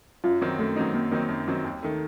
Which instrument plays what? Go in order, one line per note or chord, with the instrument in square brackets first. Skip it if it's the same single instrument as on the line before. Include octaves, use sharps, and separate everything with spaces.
[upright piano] F#2 [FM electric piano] F4
[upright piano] D#3 F#3 C4 D#4
[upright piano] F#2 [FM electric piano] A3
[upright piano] D#3 F#3 C4 D#4
[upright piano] F#2 [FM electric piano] A#3
[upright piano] D#3 F#3 C4 D#4
F#2
D#3 F#3 C4 D#4
D#2
D#3 A3